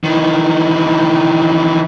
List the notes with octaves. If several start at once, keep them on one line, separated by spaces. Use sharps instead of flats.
D#3 E3